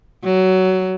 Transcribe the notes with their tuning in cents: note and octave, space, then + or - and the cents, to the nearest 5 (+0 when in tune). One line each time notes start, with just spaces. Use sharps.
F#3 +15